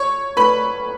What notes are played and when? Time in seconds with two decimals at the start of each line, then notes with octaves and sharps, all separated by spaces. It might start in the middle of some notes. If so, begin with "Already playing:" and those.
Already playing: C#5 C#6
0.37 B4 B5